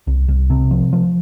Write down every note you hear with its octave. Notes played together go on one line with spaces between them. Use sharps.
C2
C2
C3
F3
F3